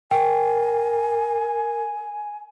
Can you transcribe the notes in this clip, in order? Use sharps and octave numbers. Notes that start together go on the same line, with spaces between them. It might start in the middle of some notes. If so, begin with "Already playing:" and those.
A#4 G5 G#5